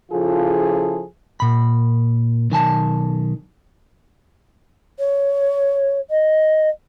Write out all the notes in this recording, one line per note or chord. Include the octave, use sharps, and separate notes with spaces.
C#3 F3 E4 F4 G#4 A4
A#2 B5
B1 D#3 G#5 A5
C#5
D#5